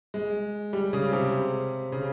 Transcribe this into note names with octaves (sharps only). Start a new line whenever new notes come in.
G#3
G3
C#3
C3
C#3